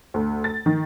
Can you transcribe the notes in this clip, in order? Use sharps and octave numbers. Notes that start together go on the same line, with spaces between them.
D2
A6
D#3